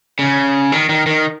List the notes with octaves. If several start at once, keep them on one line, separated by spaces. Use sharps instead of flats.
C#3
D#3
D#3
D#3